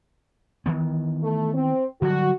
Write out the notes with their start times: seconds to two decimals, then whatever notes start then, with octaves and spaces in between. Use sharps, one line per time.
0.66 D#3 E3 B3
1.22 A3
1.54 C4
2.02 D3 F#3 G3 F#4